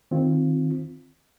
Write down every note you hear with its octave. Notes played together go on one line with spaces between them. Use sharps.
D#3 C4 F4